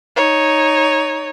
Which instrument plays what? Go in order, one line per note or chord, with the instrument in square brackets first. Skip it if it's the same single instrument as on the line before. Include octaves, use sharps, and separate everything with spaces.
[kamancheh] D#4 C#5